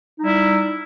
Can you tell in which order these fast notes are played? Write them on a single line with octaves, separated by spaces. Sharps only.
D#4 G3 E4